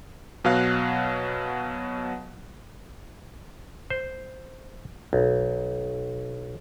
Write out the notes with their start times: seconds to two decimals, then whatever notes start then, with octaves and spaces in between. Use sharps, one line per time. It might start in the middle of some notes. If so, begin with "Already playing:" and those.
0.45 B2 F#3 F5 F#6
3.90 C5
5.13 B1